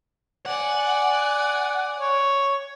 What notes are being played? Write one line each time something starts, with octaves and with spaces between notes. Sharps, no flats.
D5 F#5 G#5
C#5